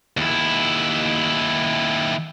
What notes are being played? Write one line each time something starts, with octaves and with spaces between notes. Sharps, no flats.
D#2 E4